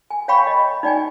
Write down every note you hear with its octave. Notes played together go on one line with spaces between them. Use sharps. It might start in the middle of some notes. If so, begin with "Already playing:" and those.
G#5
C#5 F5 G5 B5 C#6
D#5
D#4 D5 G5 G#5